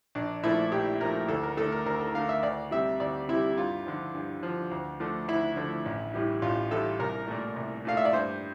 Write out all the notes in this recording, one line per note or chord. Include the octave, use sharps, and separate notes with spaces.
A#1 D4
A#2 F3 A3 E4
A#1 G4
A#2 F3 A3 A#4
D2 A4
A#4
D3 A3 A4
A#4
D2 A#4
A4
D3 A3 F5
E5
D2 D5
C3 G3 E5
D2 D5
C3 G3 E4
G2 F4
D3 F3
G2
D3 F3
D2
D3 F3 A3
D2 E4
D3 F3 A3
A1
A2 E3 G3
A1 F4
A2 E3 G3 A4
C2 A#4
A#2 A3
C2
A#2 A3 F5
E5
D5
G2 C5